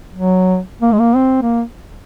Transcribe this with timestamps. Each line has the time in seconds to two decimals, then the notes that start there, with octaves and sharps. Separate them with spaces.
0.14 F#3
0.81 A#3
0.92 G#3
0.99 A#3
1.16 C4
1.42 A#3